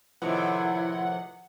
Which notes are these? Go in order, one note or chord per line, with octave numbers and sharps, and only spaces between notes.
A2 C3 D#3 F3 E4 B4 F#5